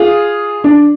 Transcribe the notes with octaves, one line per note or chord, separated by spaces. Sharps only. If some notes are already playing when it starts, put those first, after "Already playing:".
Already playing: F4 G#4
D4